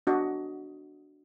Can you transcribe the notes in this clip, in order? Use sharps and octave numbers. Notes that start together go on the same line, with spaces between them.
D4 F#4 D#5